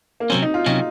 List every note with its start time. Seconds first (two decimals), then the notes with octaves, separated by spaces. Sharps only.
0.20 A#3
0.30 C3 F#3 C4 C#4
0.42 D#4
0.54 F4
0.66 C3 F#3 C#4 D#4